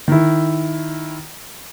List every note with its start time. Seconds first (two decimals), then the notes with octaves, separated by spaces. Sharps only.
0.08 D#3 E4